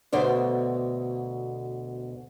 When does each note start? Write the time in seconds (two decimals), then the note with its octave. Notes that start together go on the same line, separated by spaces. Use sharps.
0.12 D2 B2 C5 D5